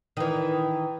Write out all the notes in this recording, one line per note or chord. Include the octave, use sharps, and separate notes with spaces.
D#3 E3